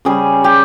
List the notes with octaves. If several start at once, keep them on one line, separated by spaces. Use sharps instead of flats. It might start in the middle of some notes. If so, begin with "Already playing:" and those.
C#3 G3 G#4
G4